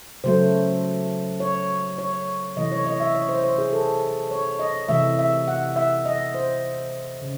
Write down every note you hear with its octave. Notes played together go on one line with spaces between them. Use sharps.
C#3 F#3 A3 C5
C#5
C#5
C3 E3 A3 D#5
C#5
D#5
E5
C#5
C5
C5
G#4
A4
C#5
D#5
C3 E3 A3 E5
E5
F#5
E5
D#5
C5
C#3